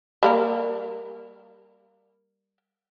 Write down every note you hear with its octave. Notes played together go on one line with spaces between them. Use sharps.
G3 A#3 A#4